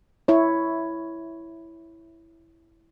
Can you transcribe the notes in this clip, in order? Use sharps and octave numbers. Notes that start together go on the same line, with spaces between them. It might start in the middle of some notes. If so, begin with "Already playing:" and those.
E4 C#5